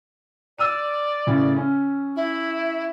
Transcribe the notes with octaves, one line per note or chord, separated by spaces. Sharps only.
D5 E6 F6 D#7
A2 C#3 E3
C#4
E4